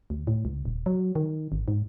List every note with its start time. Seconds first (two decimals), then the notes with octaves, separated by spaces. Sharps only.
0.10 D2
0.27 A2
0.45 C#2
0.65 D#1
0.86 F#3
1.15 D#3
1.52 G#1
1.68 G#2